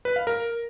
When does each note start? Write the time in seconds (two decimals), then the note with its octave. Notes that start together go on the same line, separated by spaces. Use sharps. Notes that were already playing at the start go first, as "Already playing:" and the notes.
0.05 B4
0.16 F5
0.27 A#4